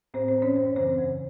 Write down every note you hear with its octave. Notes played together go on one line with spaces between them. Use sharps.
A2 C4 C5
C4 C5
E3
C#4 C#5
F#2 C5
C#5
C#3 E3 C4 C5
F2